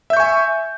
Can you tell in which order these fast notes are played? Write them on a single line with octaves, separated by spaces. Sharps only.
E5 G6 C#6 G#5